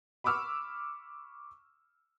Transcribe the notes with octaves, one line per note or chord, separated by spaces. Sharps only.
B5 C#6 D6 E6 F6